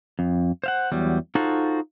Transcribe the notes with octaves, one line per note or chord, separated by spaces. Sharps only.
F2
C5 F5 F#5
E2 F#3 G3
D#4 F4 F#4 A4 C5